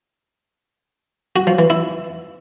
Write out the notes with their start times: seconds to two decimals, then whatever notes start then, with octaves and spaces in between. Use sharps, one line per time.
1.36 F#4
1.47 F3
1.59 E3
1.70 E4